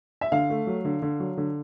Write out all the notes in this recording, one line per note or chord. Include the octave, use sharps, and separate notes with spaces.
E5
D3 F5
A3
F#3
D3
D3
F#3
D3